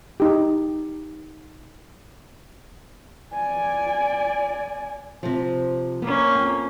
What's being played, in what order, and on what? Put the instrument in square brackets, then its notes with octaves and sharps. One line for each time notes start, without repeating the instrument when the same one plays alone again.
[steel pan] D#4 G4
[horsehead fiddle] D5 G#5
[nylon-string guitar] C3 F3
[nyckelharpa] A#3 C#4 [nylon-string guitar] B3
[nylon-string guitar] F2 G5